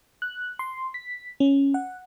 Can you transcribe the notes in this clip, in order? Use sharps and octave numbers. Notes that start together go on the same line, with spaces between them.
F#6
C6
B6
C#4
F#5